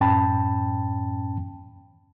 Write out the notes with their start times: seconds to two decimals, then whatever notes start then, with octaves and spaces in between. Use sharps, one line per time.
0.01 F#2 A2 C#4 G5 A5 B5